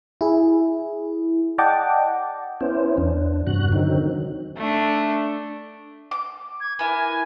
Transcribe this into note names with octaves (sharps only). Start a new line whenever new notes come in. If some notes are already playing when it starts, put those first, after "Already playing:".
E4 G#4
D5 D#5 F#5 G5 A5 D6
B3 C#4 E4 C5
E2 D4
G2 C3 F#4 F#6
D3 D#3 F#3 C4 D#4
A3 D4
D6
G#6
E4 A#4 B4 G#5